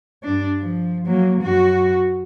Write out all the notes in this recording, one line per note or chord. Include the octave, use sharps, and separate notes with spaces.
G2 D4
F3
F#3 A#3
F#2 F#4